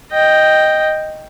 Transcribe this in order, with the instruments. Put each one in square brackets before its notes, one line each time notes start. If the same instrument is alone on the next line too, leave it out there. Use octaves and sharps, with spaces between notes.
[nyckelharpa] D#5 G5